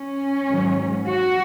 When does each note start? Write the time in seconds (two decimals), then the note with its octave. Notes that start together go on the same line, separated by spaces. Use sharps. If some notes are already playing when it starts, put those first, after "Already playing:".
Already playing: C#4
0.48 G#2 D#3 F#3
1.08 F#4